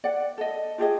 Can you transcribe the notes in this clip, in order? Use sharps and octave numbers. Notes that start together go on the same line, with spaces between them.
D5 F#5
A4 D#5
F4 G4 G#4 D#5